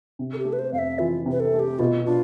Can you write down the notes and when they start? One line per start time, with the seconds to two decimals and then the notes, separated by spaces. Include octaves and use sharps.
0.19 C3
0.33 A4
0.38 G4
0.45 A3
0.53 B4
0.59 C5
0.73 F2 F5
0.78 E5
0.99 E3 F4
1.26 C3
1.31 B4
1.40 A4
1.53 A3
1.59 G4
1.79 B2 F4
2.06 D4 F4